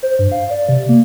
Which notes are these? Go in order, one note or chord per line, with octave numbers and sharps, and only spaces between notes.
C5
G2
F5
D5
C3
A#3